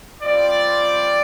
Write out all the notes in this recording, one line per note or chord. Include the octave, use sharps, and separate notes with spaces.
G3 C4 F4 D5